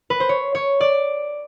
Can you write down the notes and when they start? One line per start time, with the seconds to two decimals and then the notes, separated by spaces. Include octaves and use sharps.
0.10 B4
0.20 C5
0.29 C#5
0.55 C#5
0.81 D5